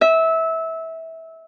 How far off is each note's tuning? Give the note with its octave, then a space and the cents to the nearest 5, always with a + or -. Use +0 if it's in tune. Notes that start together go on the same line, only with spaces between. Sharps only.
E5 -20